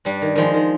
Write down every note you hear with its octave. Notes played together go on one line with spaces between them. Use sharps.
G2 G3
D#3
D#3 F3 G#3
D#3